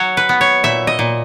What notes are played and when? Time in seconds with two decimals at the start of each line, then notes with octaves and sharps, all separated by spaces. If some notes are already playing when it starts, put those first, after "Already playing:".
Already playing: F#3 C#5
0.17 B4
0.29 B3
0.41 C#5
0.64 A#2 E5
0.87 D#5
0.99 A#2